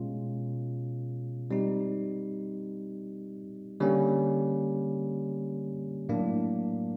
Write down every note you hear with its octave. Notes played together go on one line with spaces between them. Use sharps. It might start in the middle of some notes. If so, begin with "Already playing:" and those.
Already playing: B2 G#3 C#4 F4
G3 C4 D#4
D3 G3 A#3 C#4
A2 F#3 A#3 D4